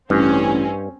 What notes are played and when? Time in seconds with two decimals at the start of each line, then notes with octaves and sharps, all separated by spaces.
0.10 A1 G2 C4 C#4